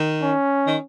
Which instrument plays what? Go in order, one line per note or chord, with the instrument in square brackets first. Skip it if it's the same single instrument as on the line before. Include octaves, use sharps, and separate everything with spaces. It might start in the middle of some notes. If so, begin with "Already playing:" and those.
Already playing: [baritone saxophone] D#3
[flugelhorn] C#4
[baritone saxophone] D#3